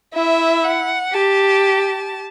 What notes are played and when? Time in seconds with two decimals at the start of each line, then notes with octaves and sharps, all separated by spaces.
0.14 E4 E5
0.64 F#5
1.13 G4 A5